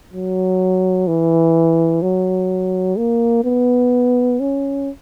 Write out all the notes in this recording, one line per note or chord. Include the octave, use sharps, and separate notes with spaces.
F#3
E3
F#3
A#3
B3
C#4